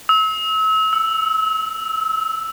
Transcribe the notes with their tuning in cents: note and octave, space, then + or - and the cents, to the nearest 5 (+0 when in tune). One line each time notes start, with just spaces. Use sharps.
E6 -35
E6 +0